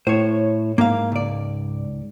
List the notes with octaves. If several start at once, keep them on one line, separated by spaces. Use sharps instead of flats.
A2 C5 C#5
G#2 A#3 F5
C#2 D5